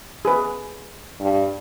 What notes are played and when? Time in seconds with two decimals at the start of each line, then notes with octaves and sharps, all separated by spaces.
0.25 G#4 B4
1.21 G2